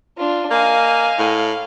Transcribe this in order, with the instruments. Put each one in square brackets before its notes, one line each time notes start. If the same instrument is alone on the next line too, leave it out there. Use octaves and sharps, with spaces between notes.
[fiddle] D4 F4
[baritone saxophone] A#3 [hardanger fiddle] D#5 G#5 [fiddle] F5
[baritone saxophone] A2